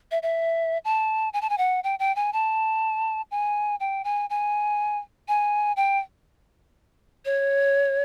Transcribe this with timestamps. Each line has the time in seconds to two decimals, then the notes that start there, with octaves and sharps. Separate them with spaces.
0.11 E5
0.23 E5
0.85 A5
1.33 G#5
1.42 A5
1.50 G#5
1.58 F#5
1.84 G5
1.99 G5
2.16 G#5
2.33 A5
3.31 G#5
3.80 G5
4.04 G#5
4.30 G#5
5.28 G#5
5.76 G5
7.25 C#5